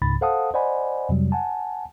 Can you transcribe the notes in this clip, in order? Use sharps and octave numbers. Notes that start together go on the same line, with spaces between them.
C#2 G#2 C#3 B5 A6
A4 C5 F5 F#5 A5 D#6
C5 D5 D#5 F#5 G#5 B5
F2 C3 F#3 G3
F#5 G#5 A5